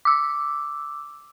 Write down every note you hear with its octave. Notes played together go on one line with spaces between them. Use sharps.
D6 E6